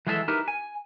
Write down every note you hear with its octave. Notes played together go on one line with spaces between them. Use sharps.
E3 F#3 G#3 G#4 A4 E5
D#4 E4 G4 A#4 B4
G#5